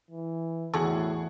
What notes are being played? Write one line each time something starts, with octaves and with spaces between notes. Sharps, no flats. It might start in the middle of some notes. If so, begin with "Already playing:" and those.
E3
E2 A2 F#4 G#4 A4 C#6